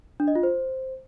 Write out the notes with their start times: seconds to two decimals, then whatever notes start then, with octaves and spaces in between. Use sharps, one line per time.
0.20 D4
0.28 D#5
0.35 F4
0.43 C5